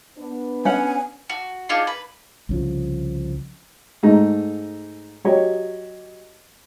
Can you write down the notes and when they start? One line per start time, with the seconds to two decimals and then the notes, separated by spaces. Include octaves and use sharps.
0.18 B3 D4
0.65 C#4 F#5 G#5
1.30 F#4
1.69 D4 D#4 F4 G#4
1.87 B4
2.49 C2 C#3 F3
4.03 G#2 A3 D#4
5.24 F#3 G4 C#5 D#5